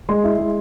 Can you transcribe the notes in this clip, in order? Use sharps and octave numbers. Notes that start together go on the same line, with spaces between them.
G#3 C6
E4
G#3